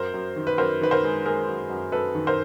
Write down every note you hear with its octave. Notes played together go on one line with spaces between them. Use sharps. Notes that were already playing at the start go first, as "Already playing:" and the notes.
Already playing: F#2 A#4 C5
F#2
D#3
B4
F#2 A#4 C5
D#3 B4
A#4 C5
G#3
G#3 G#4 A#4
F#2
F#2
F#2 A4 B4
D#3
A#4 C5